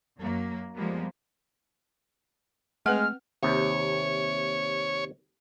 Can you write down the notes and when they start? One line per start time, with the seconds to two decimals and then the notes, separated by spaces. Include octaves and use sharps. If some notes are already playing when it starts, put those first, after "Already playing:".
0.20 F#2 F#3 A#3
0.75 F3 G3 G#3 A#3 B3
2.86 G#3 A3 C4 B4 F#5 F6
3.43 D#2 C3 C#5